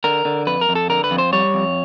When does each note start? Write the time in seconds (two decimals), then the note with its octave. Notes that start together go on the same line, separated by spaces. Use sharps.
0.04 D3 A#4
0.25 D3
0.47 F2 B4
0.61 A#4
0.69 F2
0.75 A4
0.90 D3 A#4
1.04 B4
1.11 F2
1.18 C5
1.33 G3 C#5
1.54 F2